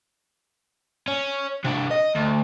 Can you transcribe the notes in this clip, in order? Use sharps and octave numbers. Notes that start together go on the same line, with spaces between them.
C#4
C3 D4
D#5
D2